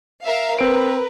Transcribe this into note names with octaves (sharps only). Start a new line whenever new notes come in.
A#4 E5 F5
C4 A#4 B4 D7